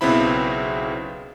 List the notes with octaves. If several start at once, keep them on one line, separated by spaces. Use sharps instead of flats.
B1 C#3 B3 C4 E4 B5